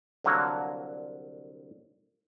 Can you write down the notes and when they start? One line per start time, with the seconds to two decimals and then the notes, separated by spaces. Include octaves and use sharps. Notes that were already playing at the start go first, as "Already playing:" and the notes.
0.24 C2 D3 F#3 A#3 F#4